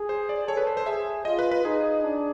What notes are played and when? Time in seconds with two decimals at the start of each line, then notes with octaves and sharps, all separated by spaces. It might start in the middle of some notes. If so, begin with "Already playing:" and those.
Already playing: G#4
0.09 C5
0.29 D5
0.48 A4 C#5
0.57 B4
0.67 C5
0.77 C5
0.86 G#4 E5
1.25 F4 D#5
1.39 B4
1.51 B4
1.64 D#4 G#4
2.03 D4